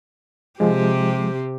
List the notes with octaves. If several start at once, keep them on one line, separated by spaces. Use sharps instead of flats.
C3 F3 G#3 C4 G4